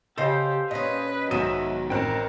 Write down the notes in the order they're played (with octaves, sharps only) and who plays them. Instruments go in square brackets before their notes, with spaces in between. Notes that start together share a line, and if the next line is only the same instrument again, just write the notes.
[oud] C#3 D#5 [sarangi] G4 [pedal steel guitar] A4 C5 F5
[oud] A#2 C#4 [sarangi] B4 [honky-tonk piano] D#5
[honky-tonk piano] B1 [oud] G#2 D#3 [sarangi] F#3 [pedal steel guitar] D#5 E5
[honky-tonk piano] A1 C4 [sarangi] A#4 [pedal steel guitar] G5 F#6